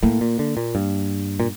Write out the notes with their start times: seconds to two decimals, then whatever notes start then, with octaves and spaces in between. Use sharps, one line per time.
0.03 A2 A#3
0.21 A#2
0.39 D3
0.57 A#2
0.75 G2
1.40 A#2